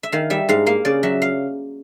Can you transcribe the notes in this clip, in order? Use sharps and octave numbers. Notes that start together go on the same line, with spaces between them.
E5
D#3 F5
G3 E5
G#2 F5
A#3 F5
C#3 D5
F#3 E5
F5